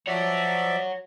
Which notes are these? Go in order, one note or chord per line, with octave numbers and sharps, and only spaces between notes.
F3 C#5 D5 E5 F#5